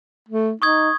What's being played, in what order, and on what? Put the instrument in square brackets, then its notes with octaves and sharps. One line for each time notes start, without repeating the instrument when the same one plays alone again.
[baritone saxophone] A3
[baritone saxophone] D#4 [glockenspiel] C#6 D#6 G#6